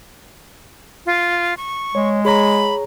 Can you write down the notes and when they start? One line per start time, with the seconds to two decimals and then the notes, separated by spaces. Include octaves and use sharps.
1.06 F4
1.57 C#6
1.95 G#3 C#5
2.25 G#4 C#5 A#5 B5